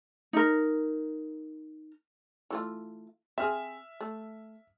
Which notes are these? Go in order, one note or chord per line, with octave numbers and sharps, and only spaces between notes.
D#4 A#4
E3 A3 F4
C4 G#4 E5 F6
A3